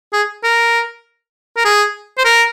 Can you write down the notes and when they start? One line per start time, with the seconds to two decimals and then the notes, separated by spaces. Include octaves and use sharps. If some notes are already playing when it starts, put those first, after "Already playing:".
0.13 G#4
0.44 A#4
1.57 A#4
1.65 G#4
2.18 C5
2.25 A#4